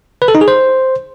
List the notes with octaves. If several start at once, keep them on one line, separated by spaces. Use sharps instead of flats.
B4
A4
D#4
G#4
C5